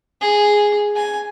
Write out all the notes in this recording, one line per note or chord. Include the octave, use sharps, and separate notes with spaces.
G#4
G#5